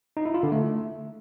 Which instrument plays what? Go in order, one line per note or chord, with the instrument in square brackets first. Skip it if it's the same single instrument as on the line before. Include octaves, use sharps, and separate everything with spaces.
[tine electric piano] D#4
E4
F4
D3
A3